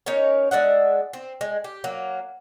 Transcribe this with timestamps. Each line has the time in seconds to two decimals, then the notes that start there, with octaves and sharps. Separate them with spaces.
0.06 C#4 D#4 A#4 C#5
0.51 G#3 D4 E5 F#5
1.13 C4
1.41 G#3
1.64 G4
1.84 F#3 A#3